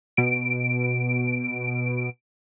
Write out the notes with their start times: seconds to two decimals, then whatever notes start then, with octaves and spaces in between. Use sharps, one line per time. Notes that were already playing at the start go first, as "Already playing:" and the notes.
0.17 B2 D7